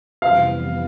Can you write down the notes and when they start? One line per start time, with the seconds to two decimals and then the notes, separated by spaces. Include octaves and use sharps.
0.22 F2 C3 E3 G3 B3 F5